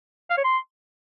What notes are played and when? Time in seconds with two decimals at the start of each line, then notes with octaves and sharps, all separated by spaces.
0.30 F5
0.37 C#5
0.45 C6